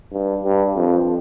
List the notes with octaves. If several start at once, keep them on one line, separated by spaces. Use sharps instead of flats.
G2
G2
F2